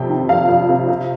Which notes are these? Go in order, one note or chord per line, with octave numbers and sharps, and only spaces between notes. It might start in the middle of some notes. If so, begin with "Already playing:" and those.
Already playing: F2 C3 G5
D#3
F2 F5
F2
C3
C3